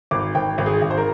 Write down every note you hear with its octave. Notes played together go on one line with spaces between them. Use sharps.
G#1 D6
G#1 G5
G#1
G#4
G#1
C5
A#4